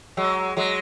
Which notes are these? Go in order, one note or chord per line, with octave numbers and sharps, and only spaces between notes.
F#3 G#3
F#3 G#3